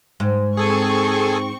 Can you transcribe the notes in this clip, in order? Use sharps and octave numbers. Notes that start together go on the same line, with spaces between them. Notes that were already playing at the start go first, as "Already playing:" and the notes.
G#2
C4 G#4 A4 G#5 C#6